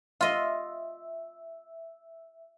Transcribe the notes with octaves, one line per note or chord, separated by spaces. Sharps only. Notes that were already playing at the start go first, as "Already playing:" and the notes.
F4 D#5 E5